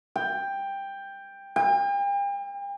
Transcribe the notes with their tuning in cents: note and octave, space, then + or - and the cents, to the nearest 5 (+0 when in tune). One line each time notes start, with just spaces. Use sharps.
G5 +10
G5 +40